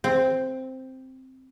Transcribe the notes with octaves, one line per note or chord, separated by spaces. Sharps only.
C4